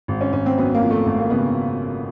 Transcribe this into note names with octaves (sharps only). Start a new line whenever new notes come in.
G#1
C#4
G#1 C#4
C4
F#2 B3
A#3
F3
A3
G#1 A3
A#3
C#3 B3